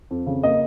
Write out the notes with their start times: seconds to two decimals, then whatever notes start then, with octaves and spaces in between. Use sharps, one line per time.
0.11 F2
0.27 C#3
0.43 A#3 D#5